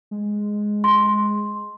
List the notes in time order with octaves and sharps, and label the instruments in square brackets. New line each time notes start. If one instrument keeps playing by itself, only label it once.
[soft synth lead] G#3
[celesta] C6